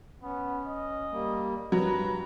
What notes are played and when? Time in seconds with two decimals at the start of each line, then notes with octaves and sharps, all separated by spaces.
0.23 B3 C#4
0.67 D#5
1.11 G3 A#3
1.72 G2 F#3 G3 B4 A#5